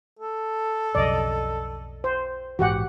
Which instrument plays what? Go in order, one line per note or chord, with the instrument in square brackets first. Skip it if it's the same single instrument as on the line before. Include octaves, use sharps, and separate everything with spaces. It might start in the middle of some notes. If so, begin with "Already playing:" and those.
[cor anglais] A4
[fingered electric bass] B1 F2 C#3 [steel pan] D5 D#5
[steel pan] C5
[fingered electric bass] A#1 G#2 E3 [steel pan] F#4 G4 F#5